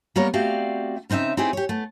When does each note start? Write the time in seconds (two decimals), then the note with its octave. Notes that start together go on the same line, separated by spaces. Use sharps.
0.16 G3 A#3 B3 A#4 C#5
0.34 A3 C4 F#4 G4 D5 F5
1.10 C#3 C4 D#4 D#5 E5
1.37 C4 D#4 E4 G4 G#4
1.53 G4 C#5
1.69 A3 B3